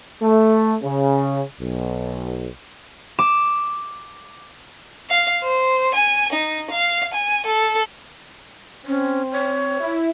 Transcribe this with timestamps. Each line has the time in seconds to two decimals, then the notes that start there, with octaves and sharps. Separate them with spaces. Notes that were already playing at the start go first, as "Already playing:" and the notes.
0.21 A3
0.82 C#3
1.60 B1
3.19 D6 E7
5.10 F5
5.44 C5
5.95 G#5
6.33 D#4
6.71 F5
7.14 G#5
7.46 A4
8.86 C4 C#4 C5
9.32 C#5
9.80 E4